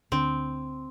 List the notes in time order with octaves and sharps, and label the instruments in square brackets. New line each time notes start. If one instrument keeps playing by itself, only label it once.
[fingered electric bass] D2 D3 D4 [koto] C4